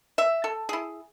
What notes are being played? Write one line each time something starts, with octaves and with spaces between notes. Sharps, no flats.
E5
A4
E4 G#4